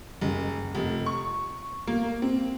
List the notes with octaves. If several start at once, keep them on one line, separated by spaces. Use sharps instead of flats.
F#1
F1
C#6
A#3
C4